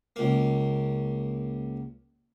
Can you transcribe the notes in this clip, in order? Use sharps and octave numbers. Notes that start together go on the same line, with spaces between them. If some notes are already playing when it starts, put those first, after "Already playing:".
C#2 A#3